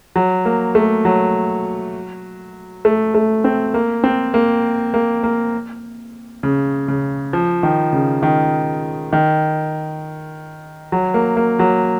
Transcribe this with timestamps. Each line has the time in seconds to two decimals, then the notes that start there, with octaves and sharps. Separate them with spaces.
0.16 F#3
0.45 A#3
0.75 A3
1.05 F#3
2.85 A3
3.15 A3
3.44 C4
3.74 A#3
4.04 C4
4.34 A#3
4.94 A#3
5.23 A#3
6.43 C#3
6.88 C#3
7.33 F3
7.63 D#3
7.93 C#3
8.23 D#3
9.13 D#3
10.92 F#3
11.14 A#3
11.37 A#3
11.59 F#3